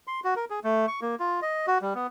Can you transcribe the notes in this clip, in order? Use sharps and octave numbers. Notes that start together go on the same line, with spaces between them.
C6
F#4
A#4
G#4
A3
C#6
A#3
F4
D#5
F#4
G3
B3